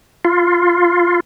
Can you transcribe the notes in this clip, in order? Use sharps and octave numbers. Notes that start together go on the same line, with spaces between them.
F4